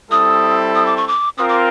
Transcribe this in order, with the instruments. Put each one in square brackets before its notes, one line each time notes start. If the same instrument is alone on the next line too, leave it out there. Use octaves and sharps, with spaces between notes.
[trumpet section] G3 C4 E4 A4 [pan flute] D#6
[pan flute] D#6
D6
C#6
D6
[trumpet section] C4 F4 A#4 [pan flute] D#6
[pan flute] D6